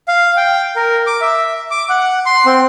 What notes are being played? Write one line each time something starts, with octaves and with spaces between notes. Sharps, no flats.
F5
G5
A#4
D6
E5
D6
F#5
C6
C4